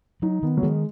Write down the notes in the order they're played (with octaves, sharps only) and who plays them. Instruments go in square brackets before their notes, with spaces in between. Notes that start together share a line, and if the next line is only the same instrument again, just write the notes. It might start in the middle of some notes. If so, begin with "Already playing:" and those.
[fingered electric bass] F#3 [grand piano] D#4
[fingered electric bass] D#3 [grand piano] B3
[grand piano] F#3
[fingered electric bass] D#3 [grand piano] G#3